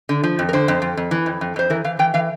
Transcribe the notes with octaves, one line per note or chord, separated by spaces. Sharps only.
D3
F3
F2
A#4
D3 C5
F2
F2
F2
E3
F2
F2
F2 C5
E3 A#4
E3 F5
E3 G5
E3 F5